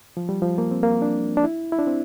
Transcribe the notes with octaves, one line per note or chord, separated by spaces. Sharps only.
F3
G3
F3
A#3
C4
A#3
D4
D4
E4
E4
D4
C4